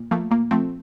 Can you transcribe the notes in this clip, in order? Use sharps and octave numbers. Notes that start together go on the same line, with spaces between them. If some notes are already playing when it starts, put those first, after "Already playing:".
Already playing: A#2
F3 A3 A#3
A#2 A#3
F3 A3 C4